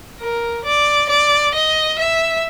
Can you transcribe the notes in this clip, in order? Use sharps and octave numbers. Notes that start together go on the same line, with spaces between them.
A#4
D5
D5
D#5
E5